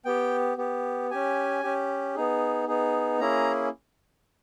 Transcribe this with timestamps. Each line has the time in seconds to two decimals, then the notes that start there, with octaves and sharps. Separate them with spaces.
0.05 B3 G4 G5
0.57 B3 G4
1.11 C#4 G4 G#5
1.63 C#4 G4
2.15 B3 D#4 G#4
2.67 B3 D#4 G#4
3.20 A#3 C#4 E4 G#4 A#5